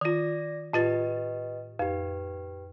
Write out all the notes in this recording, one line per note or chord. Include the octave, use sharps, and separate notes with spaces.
D#3 F4 D5 A#6
A2 F4 G4 B4 D#5 A6
F2 G4 B4